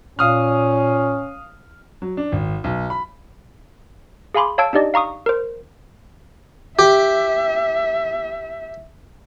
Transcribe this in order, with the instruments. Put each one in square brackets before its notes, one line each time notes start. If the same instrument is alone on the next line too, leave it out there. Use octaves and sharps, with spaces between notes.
[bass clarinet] A#2 [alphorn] C#4 [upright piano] F5 D#6 F6
[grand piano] F#3
D4
G#1
B1
B5
[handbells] G#4 F5 G#5 B5 C6 D6
C#5 F5 A5 E6 G#6 D7
D4 D#4 G4 D5 D#5
F5 A#5 C#6 D#6
A#4 C5
[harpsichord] G4 [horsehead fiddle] E5